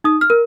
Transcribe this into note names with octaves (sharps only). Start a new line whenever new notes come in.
D#4 D#6
F6
A#4